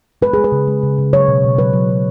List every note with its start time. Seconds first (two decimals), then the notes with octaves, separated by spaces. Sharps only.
0.22 G#3 B4
0.33 G#3 G#4
0.44 B4
0.52 C#3
0.68 G#3
0.83 C#3
0.98 C#3
1.13 F#3 C#5
1.28 B2
1.44 B2
1.58 F#3 B4
1.73 F#3
1.90 F#3